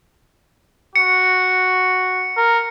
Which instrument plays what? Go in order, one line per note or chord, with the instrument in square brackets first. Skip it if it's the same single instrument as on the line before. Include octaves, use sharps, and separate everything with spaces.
[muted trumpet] F#4 [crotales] C#7
[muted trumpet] A#4